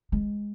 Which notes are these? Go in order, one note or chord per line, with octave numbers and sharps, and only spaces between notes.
G#3